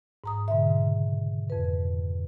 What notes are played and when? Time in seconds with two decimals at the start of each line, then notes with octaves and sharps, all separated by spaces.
0.24 G#2 A#5 D#6
0.48 G#2 B2 D3 E5
0.67 C#3
1.50 F2 B4